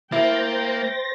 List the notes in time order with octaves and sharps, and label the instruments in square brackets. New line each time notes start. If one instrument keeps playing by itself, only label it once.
[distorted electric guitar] A#3 [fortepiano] E4 [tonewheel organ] C5 A6 A#6 [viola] G5